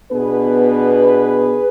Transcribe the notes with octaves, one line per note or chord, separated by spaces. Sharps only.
B2 B3 D4 G#4 B4